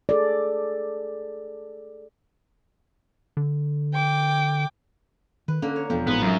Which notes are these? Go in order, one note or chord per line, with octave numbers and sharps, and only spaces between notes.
G#4 A4 D5
D3
G5 D6
D#3 B4
D3 A#3 C#4
C#5
E1 F2 F3 B3 F4
A1 G#2 B3 G#4
F#2